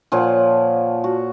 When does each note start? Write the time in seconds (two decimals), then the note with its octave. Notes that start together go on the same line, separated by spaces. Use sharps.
0.12 A#2 F3 C#5 F#5
1.04 F#4